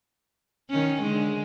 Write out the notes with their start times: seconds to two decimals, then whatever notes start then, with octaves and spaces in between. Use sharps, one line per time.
0.70 D#3 C#4
1.02 D3 G#3